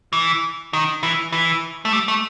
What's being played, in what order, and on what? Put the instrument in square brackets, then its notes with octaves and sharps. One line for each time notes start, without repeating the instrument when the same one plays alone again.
[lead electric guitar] E3
D#3
E3
E3
A3
G3
A3